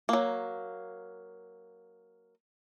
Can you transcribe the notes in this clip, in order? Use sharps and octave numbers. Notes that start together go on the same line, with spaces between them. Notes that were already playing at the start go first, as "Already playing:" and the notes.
F#3 A#3